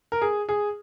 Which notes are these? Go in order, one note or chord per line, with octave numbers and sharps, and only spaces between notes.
A#4
G#4
G#4